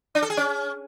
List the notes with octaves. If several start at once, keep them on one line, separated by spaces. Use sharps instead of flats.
D4
A4
G#4
C#4